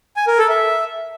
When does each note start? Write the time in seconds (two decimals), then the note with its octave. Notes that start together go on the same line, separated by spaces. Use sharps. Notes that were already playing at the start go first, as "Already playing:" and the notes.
0.16 G#5
0.27 A#4
0.38 A4
0.49 E5